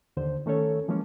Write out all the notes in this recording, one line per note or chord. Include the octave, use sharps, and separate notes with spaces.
D#2 D3 C5
D#3 A3 C#4 A4 C#5
E3 F3 G#3 A#3 C#4